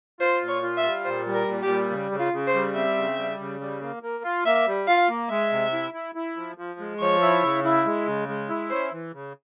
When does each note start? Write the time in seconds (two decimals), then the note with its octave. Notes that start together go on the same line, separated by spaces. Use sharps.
0.20 F4 C5
0.41 A#2
0.48 C#5
0.63 F4
0.78 E5
0.84 G3
1.05 A#2 C5
1.27 G3
1.34 A#4
1.48 A#2
1.63 G4
1.69 G3
1.90 C#3
2.12 C#3
2.19 F4
2.33 C#3
2.47 C5
2.54 G3
2.75 C4 E5
2.97 C#3
3.18 G3
3.39 C#3
3.61 G3
3.82 A#3
4.03 A#3
4.24 F4
4.46 A#3 E5
4.67 G3
4.87 F4 F5
5.09 A#3
5.30 G#3 E5
5.51 C3
5.73 E4
5.94 E4
6.15 E4
6.37 F3
6.58 F3
6.80 G#3
7.00 F3 C#5
7.22 E4
7.43 C#3
7.64 E4
7.86 G#3
8.07 C#3
8.28 G#3
8.49 E4
8.70 C#4 C5
8.92 E3
9.13 C#3